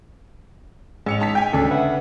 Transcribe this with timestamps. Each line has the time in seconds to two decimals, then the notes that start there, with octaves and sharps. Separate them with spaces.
1.06 A1 G#3 C#7 F7
1.20 D#4 A5 B6
1.35 G5 G#5
1.53 D2 C#3 D4 A4
1.71 B4 E5 F#5